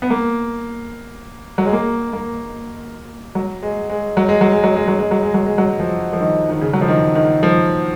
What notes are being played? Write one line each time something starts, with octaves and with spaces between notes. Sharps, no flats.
B3
A#3
F#3
G#3
A#3
A#3
F#3
G#3
G#3
F#3
G#3
F#3
G#3
F#3
G#3
F#3
G#3
F#3
G#3
F#3
G#3
F#3
F3
F3
D#3
D#3
C#3
F#3
F3
D#3
D#3
F3